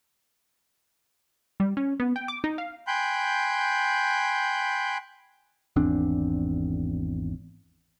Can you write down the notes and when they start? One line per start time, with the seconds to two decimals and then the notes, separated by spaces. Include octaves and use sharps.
1.60 G3
1.77 C#4
2.00 B3
2.16 G5
2.28 D6
2.44 D#4
2.58 F5
2.87 G5 G#5 B5 C6 F#6 G6
5.76 G#1 E2 C4 D4